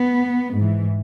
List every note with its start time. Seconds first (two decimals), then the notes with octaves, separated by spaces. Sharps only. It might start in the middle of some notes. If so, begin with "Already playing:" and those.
Already playing: B3
0.56 G#2 E3